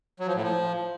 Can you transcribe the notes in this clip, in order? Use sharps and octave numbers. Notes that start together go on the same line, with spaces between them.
F#3
F3
A2
F3